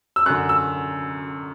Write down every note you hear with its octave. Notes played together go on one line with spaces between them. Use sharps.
E6
F#2 D3 F#6
E6